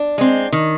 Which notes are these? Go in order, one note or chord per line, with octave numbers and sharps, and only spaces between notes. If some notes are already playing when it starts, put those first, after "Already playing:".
Already playing: D4
G#3 C4
D#3